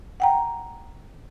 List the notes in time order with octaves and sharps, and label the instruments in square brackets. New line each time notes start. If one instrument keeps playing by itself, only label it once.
[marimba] F#5 G5 A#5